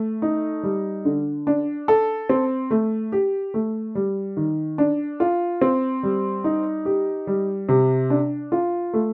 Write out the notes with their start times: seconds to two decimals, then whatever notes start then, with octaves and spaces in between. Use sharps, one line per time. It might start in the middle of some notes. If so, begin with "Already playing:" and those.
Already playing: A3
0.22 D#4
0.63 G3
1.05 D3
1.47 D4
1.88 A4
2.29 C4
2.71 A3
3.12 G4
3.54 A3
3.95 G3
4.37 D#3
4.78 D4
5.20 F4
5.61 C4
6.03 G3
6.44 D#4
6.85 G4
7.27 G3
7.69 C3
8.10 D4
8.52 F4
8.94 A3